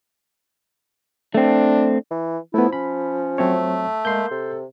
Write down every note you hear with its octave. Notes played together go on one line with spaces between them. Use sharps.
A3 C4 D4
E3
F3 A3 B3 E4
C#4 B5
F#3 A3 C4 C#5
G#3 A#3 C6 G6
C3 A4